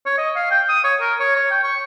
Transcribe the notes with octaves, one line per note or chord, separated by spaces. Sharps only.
C#5
D#5
F5
G5
D#6
C#5
A#4
C#5
C#5
G5
C#6